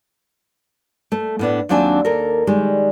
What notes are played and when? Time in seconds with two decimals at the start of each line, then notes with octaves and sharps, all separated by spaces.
1.12 A3
1.39 A2 B3 D4
1.69 D#2 F#3 C4 D4 G#5 A5
2.05 D#2 A4 A#4
2.47 D#3 G3 G#3